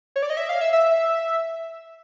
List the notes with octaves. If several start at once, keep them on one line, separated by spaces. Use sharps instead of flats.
C#5
D5
D#5
E5
F5
E5
E5